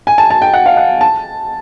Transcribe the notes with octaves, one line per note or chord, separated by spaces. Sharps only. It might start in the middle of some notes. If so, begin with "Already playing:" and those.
G#5
A5
A5
G5
F#5
F5
F#5
A5